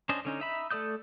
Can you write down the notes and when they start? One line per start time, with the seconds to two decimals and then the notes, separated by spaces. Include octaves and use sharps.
0.09 C#4 D4 C5 D#5
0.25 D3 C#4 D#4
0.40 D#4 E5 B5
0.71 A3 A4 D5 D#6 G6